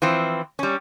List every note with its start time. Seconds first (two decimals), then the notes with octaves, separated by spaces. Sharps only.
0.02 E3 F3 C4
0.59 G3 C#4